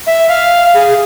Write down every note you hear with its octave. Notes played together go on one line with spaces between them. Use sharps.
E5
F5
G#4